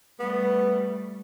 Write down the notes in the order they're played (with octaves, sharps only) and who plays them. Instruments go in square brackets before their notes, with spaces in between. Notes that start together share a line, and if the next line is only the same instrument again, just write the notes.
[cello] G3 A3 [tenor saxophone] B3